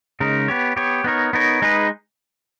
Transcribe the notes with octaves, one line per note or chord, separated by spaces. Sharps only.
C#3 G#3 D#4 A#4
B3 G4 C#5
B3 G4 C#5
B3 D#4 A#4 C#5
B3 D#4 A#4 C#5
G#3 D#4 G#4 B4